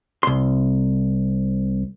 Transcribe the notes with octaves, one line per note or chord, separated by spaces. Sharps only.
C2 C6